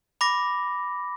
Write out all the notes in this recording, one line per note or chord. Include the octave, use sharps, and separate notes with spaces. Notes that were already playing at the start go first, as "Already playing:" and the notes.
B5 D6 A#6